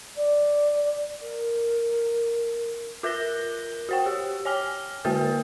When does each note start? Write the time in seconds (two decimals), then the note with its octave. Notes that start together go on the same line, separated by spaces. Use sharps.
0.16 D5
1.22 A#4
3.03 F4 A#4 F#6 A#6 G7
3.89 F#4 C5 G5
4.06 G4
4.45 C#5 G#5 F6 G7
5.05 D3 A#3 F#4 A#4 A6